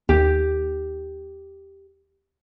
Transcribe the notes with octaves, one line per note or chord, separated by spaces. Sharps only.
D#2 G4